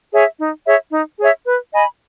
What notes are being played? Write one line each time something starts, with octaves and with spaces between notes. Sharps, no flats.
G#4 C#5 E5
D#4
G#4 C#5 E5
D#4
G#4 C#5 E5
B4
D#5 G#5 B5